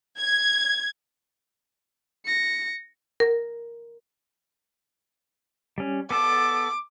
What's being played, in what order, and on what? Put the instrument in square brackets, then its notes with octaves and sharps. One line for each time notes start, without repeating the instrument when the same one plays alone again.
[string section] G#6
[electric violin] A#6 C#7
[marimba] A#4
[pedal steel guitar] G3 C#4
[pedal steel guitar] B3 A4 A5 [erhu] D6